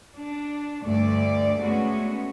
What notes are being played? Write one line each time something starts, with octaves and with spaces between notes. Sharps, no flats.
D4
D2 G2 D3 A3 D5
G#3 A3 B3 C#4 F#4